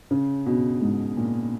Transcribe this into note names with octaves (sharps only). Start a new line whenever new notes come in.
C#3
B2
G#2
A#2